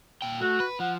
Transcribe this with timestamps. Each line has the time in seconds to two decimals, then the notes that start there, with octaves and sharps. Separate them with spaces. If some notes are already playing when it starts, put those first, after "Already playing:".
0.22 A#2 G5
0.41 A3 F#4
0.60 B4
0.80 F3 F#5